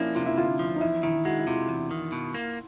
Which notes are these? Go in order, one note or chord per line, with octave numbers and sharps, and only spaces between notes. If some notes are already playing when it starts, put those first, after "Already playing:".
Already playing: F3 A#3 C#4 D4 E4
C3 F4
E4
D2 F4
F3
D#4
E2 E4
D#3 E4
G#3 F#4
E4
C3 F4
E2
D#3
B2
A#3